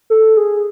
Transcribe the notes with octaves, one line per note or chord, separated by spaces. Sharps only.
A4
G#4